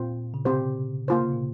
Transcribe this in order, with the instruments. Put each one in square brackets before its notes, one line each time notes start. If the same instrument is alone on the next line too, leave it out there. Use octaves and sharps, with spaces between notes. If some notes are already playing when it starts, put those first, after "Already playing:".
Already playing: [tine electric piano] A#2 [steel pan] C4 F4 C5
[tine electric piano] C#3
[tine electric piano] C3 [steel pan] C4 G4 C5
[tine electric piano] C#3 [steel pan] A#3 F4 C5
[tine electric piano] C3
A#2